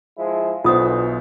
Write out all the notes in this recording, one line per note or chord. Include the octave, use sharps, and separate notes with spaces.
F3 G#3 E4
B1 D3 E3 B3 F4 C5 D#6